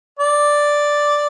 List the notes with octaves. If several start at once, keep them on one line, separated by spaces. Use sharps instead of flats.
D5